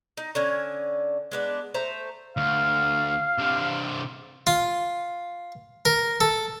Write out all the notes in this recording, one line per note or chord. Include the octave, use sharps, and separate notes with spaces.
D#4
D3 C#4 G#5
G#3 B3 D4
A3 C5 A#5
D2 F5
C3 D4
F4
A#4
A4